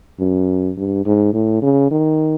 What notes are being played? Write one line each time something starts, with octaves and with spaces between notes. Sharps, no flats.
F#2
G2
G#2
A2
C#3
D#3